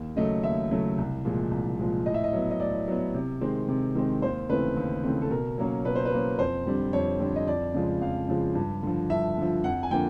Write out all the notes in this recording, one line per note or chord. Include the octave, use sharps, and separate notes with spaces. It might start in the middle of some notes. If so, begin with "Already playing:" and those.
Already playing: D#2
C#3 F#3 A3 D#5
D#2 E5
C#3 F#3 A3
C2
A#2 F3 G#3
C2
A#2 F3 G#3
A2 D#5
E5
D#5
F#3 B3
D#5
A2 D5
F#3 B3
C3
D#3 G#3 C4
C3
D#3 G#3 C4
D#2 C5
C#3 E3 A3 C4 B4
D#2
C#3 E3 A3 C4
A4
B2 A#4
F#3 A#3 C#4
B2 B4
C5
B4
F#3 A#3 C#4
F2 C5
D3 G3 C4
F2 C#5
D3 G3 C4
D#5
F2 D5
C#3 F3 G#3
F2 F5
C#3 F3 G#3
G2
D3 F3
G2 E5
D3 F3
F2 F#5
G#5
D3 F3 A#3 G5